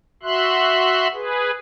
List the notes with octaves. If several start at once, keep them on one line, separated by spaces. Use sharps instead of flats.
F#4 E5 C6 F#6
G#4 B4